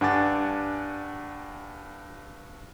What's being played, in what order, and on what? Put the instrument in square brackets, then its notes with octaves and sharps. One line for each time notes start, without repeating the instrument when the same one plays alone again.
[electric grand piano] G2 D4 F#5 G#5 D6 A6